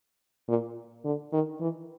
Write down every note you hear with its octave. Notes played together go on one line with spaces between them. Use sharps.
A#2
D3
D#3
E3